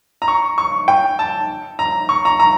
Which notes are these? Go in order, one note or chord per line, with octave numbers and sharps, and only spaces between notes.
A#5
C#6
C#6
G5
A5
A#5
C#6
A#5
A#5